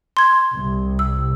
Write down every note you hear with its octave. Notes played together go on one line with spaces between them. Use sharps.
C6 G#6
C2
E6